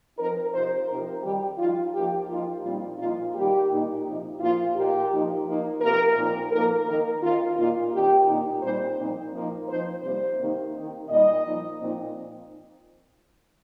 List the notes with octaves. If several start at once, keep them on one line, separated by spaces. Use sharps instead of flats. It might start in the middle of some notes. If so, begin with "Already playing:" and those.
F3 C4 D#4 A#4
C3 F3 D#4 C5
C3 F3 C4 D#4 A#4
D#3 G3 D#4 G4
F3 D#4 F4
F3 A#3 D#4 G4
F3 A#3 D#4 F4
A#2 G3 C4 D#4 F4
A#2 F3 D#4 F4
D#3 G3 A#3 G4
A#2 A#3 D#4
C3 F3 D#4
A#2 F3 A#3 F4
A#2 A#3 D#4 G4
F3 A#3 D#4
F3 A#3 D#4
C3 F3 A#3 A#4
A#2 F3 C4 D#4
F3 A#3 D#4 A#4
D#3 A#3 D#4 A#4
D#3 C4 D#4 F4
A#2 A#3 D#4 F4
D#3 C4 D#4 G4
A#2 A#3 D#4
A#2 G3 C4 D#4 C5
A#2 F3 C4 D#4
F3 A#3 D#4
F3 C4 D#4 C5
C3 G3 A#3 D#4 C5
C3 D#3 A#3 D#4
D#3 C4 D#4
A#2 G3 D#4 D#5
F3 A#3 D#4
A#2 F3 C4 D#4